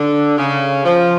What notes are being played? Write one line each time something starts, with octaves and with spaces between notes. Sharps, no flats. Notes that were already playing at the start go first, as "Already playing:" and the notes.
Already playing: D3
C#3
F3